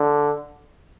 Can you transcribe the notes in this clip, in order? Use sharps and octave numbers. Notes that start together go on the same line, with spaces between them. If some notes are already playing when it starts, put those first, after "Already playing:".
Already playing: D3